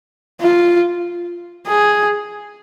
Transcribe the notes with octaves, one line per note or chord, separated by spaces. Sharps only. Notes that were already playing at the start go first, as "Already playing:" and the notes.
F4
G#4